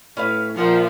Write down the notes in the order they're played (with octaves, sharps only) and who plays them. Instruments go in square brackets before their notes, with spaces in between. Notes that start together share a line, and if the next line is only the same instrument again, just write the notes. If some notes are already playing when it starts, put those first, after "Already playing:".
[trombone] A2 [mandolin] C#4 B4 F5
[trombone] A#2 [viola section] F3 [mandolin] E5 F#5 A#5